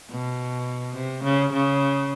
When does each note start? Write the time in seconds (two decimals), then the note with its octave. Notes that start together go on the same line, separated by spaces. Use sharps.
0.10 B2
0.95 C3
1.24 C#3
1.52 C#3